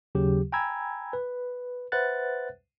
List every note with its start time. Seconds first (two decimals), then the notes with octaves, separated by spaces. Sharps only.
0.15 D#2 C#3 F#3 G4
0.52 G5 G#5 A#5 B5 E6 G#6
1.13 B4
1.92 B4 C5 E5 F#5 F#6 A6